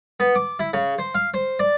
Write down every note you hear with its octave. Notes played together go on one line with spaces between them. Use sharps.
B3
D6
E4
C#3
C5
F5
C5
D5